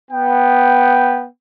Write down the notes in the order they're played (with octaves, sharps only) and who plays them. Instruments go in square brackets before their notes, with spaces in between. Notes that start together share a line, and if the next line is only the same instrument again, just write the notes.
[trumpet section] B3 G5